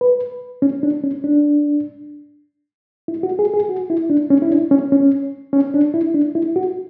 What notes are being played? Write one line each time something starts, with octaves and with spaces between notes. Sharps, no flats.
B4
C#4
D4
C#4
D4
E4
F#4
G#4
G#4
F#4
E4
D4
C#4
E4
D4
C#4
C#4
C#4
D4
E4
D4
E4
F#4